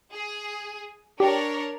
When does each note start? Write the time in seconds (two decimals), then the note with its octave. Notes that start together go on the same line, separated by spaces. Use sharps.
0.13 G#4
1.20 D4 G4 A#4 C#5